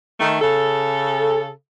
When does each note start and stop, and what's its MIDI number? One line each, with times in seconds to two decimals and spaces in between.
0.20 0.40 51
0.20 0.40 57
0.41 1.49 49
0.41 1.49 69